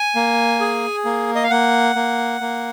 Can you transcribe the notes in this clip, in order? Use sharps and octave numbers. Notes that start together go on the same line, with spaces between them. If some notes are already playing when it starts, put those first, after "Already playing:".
Already playing: G#5
A#3
G#4
A#3
D#5
F5
A#3 F#5
A#3
A#3